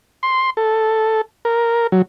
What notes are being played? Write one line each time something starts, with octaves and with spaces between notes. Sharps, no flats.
C6
A4
A#4
F#3